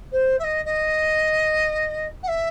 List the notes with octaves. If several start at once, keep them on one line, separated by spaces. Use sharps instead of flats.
C5
E5
D#5
D#5
F#5
E5